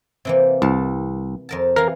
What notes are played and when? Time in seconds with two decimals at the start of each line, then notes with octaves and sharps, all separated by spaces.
0.25 C3 E3 A#3
0.62 C2 A5
1.49 F2 A#4 A5
1.76 E3 A#4 F5